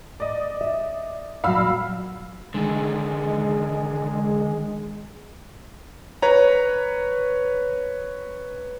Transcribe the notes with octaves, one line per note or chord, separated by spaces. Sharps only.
D5 D#5
E5
A#2 F#3 F5 B5 E6
D3 D#3 G#3
B4 C#5 A#5